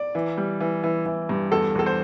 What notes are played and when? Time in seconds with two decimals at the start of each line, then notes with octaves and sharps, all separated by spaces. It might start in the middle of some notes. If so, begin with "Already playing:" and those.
Already playing: D5
0.15 E3
0.37 G3
0.60 E3
0.84 E3
1.06 E3
1.29 G2
1.52 E2 A4
1.75 E2 A4
1.86 C5